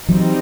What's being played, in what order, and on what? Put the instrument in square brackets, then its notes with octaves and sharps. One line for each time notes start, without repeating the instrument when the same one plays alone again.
[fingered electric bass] E3 F#3 [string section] G3 C4 D#4